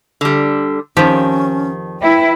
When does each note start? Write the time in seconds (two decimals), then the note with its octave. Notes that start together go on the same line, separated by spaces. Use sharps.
0.21 D3 G3
0.97 F2 D#3 F3 C#4 G4
2.01 E4 B4 G5